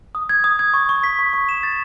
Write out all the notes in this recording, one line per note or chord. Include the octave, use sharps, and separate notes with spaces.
D#6
G#6
D#6
G#6
C#6
C#6
B6
C#6
C#6
E7
A6